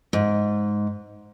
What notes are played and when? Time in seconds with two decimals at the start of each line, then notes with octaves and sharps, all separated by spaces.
0.13 G#2